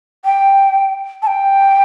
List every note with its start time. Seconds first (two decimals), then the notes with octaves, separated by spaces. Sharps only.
0.25 G5
1.22 A5
1.27 G5